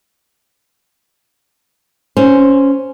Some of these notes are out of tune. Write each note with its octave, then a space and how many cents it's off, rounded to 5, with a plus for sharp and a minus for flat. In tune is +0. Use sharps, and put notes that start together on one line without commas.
C#4 +0 C5 +0